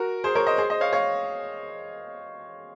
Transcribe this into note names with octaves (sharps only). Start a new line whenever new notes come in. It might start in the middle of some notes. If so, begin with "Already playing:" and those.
Already playing: F#4 A#4
G#4 C5
A#4 C#5
C5 D#5
G#4 C5
C5 D#5
C#5 F5
C#5 F5